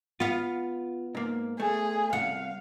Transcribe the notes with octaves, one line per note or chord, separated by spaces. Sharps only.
B3 F4 F5
G#2 A#3
A3 G#4
C2 F5 F#5